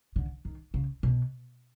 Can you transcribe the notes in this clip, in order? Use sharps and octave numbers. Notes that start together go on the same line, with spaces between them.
D3
D#3
C#3
B2